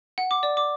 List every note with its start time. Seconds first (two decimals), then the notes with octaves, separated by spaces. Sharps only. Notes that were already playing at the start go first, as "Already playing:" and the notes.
0.18 F#5
0.31 D6
0.43 D5
0.57 D6